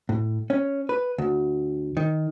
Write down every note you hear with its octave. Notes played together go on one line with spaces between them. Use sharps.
A2
C#4
B4
D2
D#3